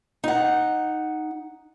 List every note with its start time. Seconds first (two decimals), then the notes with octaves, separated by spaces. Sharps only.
0.24 D#4 F#5